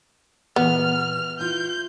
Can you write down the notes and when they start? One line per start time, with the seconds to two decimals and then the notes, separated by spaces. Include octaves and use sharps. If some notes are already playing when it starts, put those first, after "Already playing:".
0.56 A#2 E3 B3 F6
1.39 E4 F4 B4 G6